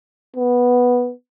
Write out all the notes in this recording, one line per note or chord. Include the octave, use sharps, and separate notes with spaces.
B3